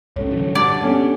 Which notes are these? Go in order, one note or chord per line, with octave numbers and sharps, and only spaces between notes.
C2 G#2 C#4 A4 C#5
D3 E3 F#3
G2 D5 F#5 A5
B3 C#4 D4 G4 A4